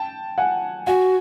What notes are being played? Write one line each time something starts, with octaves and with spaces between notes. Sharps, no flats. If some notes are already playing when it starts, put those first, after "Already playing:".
Already playing: G5 A5
F#5 G#5
F#4 F#5 G#5